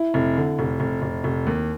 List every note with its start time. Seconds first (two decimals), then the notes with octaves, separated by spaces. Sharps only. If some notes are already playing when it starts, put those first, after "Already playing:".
Already playing: E4
0.14 F1
0.37 D3
0.59 F1
0.80 F1
1.02 F1
1.24 F1
1.46 D#2